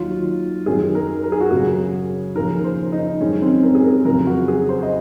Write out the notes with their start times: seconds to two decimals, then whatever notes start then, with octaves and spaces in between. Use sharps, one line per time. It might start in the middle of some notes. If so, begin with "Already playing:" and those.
Already playing: D#2 D#3 F#3 F4
0.66 F#2 D#3 F#3 G#4
0.95 A#4
1.24 A#4
1.32 G#4
1.41 F#4
1.51 F#2 C#3 F#3 G#4
2.35 D#2 C#3 F3 A#4
2.64 C5
2.92 D#4
3.20 F#2 D#3 G#3 C#4
3.42 C4
3.63 A#4
3.75 G#4
3.84 A#4
4.05 F2 C#3 F#3 A#4
4.27 F#4
4.48 G#4
4.69 C5
4.83 D#5